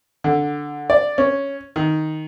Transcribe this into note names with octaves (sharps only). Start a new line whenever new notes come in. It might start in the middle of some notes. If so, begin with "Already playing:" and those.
D3
D5
C#4
D#3